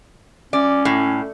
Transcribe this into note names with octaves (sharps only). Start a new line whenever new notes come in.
C#4 D5
A2